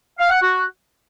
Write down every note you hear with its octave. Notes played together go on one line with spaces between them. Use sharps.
F5
F#5
F#4